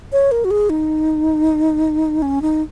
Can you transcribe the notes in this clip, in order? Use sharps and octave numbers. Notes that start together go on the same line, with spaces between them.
C#5
A#4
F#4
G#4
D#4
C#4
D#4